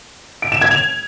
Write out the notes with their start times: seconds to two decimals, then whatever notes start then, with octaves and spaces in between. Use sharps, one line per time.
0.42 D7
0.52 E7
0.61 G#6
0.71 F7